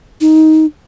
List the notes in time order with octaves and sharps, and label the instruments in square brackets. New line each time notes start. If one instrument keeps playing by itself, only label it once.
[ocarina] D#4